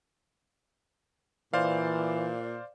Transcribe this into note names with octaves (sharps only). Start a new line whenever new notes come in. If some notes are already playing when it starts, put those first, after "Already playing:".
A#2 E3 C5 D5 F5